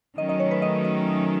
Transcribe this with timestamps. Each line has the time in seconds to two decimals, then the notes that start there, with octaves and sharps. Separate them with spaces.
0.17 D#3 F#3 A3 C#4 D#5
0.29 D#5
0.40 C#5
0.51 B4
0.62 D#5
0.84 D#5